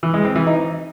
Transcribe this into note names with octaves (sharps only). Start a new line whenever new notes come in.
E3
G#3
C4
E3
D#4